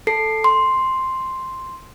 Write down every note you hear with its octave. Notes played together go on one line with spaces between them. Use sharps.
A4 C7
C6